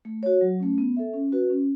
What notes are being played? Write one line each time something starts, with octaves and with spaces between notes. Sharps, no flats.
A3
F#4 C#5
F#3
A3 C#4
B3
A4 E5
C#4
F#4 B4
C#4